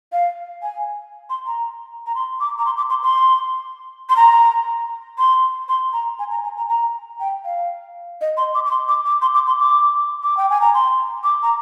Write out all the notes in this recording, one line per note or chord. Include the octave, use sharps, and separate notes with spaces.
F5
G#5
C6
A#5
A#5
C6
D6
A#5
C6
D6
C6
C6
C6
A#5
C6
C6
A#5
G#5
A#5
G#5
A#5
A#5
G5
F5
D#5
C6
D6
D6
C6
D6
D6
C6
D6
C6
D6
D6
G5
G#5
A#5
C6
D6
A#5